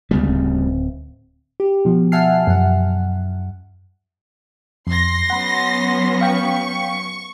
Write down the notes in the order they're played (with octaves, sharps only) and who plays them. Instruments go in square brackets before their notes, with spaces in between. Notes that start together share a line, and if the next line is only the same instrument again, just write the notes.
[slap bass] D2 C#3 G3 [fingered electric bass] G#3 B3
[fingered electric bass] D1 C4
[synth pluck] G4
B2 F3
E5 F#5 G#5 A5 F6 C7
F#2 F#5
[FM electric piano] F2 [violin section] C6 A#6
[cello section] F#3 B3 C#4 [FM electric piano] F#5 B5
[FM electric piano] F5 G5 B6 [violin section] C#6